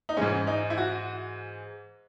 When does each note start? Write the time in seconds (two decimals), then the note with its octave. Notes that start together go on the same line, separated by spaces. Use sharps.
0.09 D#4
0.17 G#2 E3 G#3 C#4
0.47 D#4
0.70 E4
0.78 F#4